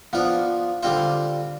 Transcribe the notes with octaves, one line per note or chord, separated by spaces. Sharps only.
F3 B3 D4 F4
D3 G3 C4 F4 C5